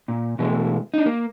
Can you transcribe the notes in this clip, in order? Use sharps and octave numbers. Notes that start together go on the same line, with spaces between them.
A#2
B2 E3 G#3 A3
D4 D#4
A#3